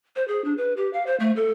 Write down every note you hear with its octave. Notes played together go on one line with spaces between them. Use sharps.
C5
G#4
D4
B4
G4
F5
C5
A3
A4